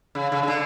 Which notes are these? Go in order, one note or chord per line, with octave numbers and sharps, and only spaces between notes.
C#3
C#3
C#3
D3